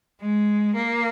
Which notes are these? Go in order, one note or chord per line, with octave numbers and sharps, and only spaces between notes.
G#3
A#3